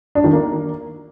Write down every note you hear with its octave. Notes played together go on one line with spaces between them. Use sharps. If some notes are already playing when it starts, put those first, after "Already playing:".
D4
D#3
A#3